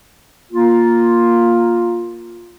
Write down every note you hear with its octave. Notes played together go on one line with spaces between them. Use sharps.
A#3 F4